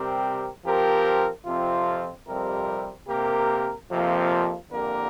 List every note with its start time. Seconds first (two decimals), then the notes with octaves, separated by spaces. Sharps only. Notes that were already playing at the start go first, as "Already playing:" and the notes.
Already playing: C3 G3 C4 G4 A#4
0.64 F3 C4 G4 A#4
1.45 F2 C3 F3 C4 F4
2.27 F2 C3 G3 C4 A#4
3.08 C3 A#3 G4 A#4
3.90 F2 C3 F3 A#3 F4
4.71 F2 D3 A#3 G4 A#4